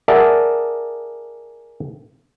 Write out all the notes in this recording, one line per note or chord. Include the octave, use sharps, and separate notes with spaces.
G#4 A#4 D5 E5 F#5 A5